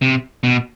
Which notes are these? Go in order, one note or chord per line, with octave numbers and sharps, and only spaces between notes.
C3
B2